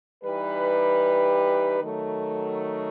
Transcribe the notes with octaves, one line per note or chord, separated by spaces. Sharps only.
E3 G3 D#4 G4 B4
D#3 F#3 A3